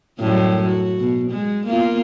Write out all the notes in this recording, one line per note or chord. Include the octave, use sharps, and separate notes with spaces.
F#2 A2 G3
F#4
B2
G#3
A#3 B3 F4